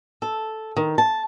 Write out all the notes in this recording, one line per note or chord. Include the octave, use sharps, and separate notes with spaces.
A4
D#3
A5